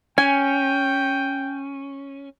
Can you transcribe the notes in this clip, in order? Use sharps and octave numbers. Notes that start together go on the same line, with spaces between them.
C#4 G5 G#5